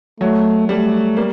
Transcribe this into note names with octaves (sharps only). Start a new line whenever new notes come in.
F#3 A3
G3 A3
G3 A#3